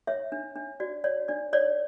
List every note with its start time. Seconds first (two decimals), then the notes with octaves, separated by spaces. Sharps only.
0.07 C#5 E5
0.32 D4
0.56 D4
0.80 F#4 D5
1.04 C#5 D5
1.28 D4 D5
1.53 C#5 D5